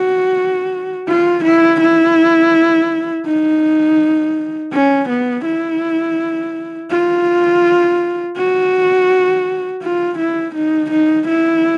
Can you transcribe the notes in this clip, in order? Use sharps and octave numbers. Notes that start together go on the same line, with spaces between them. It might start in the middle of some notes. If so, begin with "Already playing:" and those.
Already playing: F#4
F4
E4
E4
D#4
C#4
B3
E4
F4
F#4
F4
E4
D#4
D#4
E4